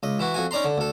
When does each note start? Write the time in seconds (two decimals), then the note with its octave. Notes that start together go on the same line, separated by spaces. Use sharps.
0.03 C#2 D#5
0.19 E3 E4 F#4
0.34 F2 F#4 G#5
0.51 C#4 D#4 D5 A#5 C6
0.65 D3
0.78 D2 A4